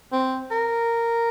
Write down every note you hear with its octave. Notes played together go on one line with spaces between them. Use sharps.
C4
A#4